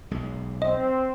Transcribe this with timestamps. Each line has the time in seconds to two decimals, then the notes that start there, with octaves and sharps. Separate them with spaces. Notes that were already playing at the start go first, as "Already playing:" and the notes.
0.11 B1 G#3
0.62 C4 D#5